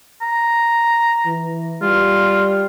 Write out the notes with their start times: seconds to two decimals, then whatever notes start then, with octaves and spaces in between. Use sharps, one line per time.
0.22 A#5
1.26 E3
1.82 G3 F4